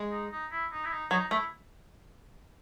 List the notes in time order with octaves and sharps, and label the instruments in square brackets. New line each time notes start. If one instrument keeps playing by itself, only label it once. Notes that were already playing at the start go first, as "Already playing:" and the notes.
Already playing: [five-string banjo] G#3
[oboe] D#4
D#4
E4
D#4
E4
D#4
[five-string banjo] F#3 [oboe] D#4
[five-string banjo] A3 [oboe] E4